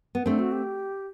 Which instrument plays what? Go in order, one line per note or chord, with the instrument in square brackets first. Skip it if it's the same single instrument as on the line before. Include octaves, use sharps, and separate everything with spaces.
[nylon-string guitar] B3
[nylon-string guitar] A3 C4 [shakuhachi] D4
[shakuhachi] F#4
G4